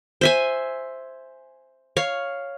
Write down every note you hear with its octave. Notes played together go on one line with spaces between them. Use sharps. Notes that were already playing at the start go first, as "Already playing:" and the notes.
C5 E5 G#5
C#5 F5